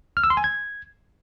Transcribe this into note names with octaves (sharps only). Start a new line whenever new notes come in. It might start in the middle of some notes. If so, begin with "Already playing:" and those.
F6
E6
C6
G#5
G#6